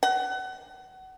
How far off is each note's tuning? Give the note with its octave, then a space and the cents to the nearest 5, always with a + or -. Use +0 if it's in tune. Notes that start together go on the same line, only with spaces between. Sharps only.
F#5 +30